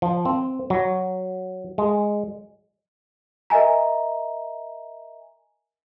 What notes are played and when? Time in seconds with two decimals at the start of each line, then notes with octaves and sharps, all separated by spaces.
0.02 F3
0.25 C4
0.70 F#3
1.78 G#3
3.50 A#4 D#5 E5 G#5 A#5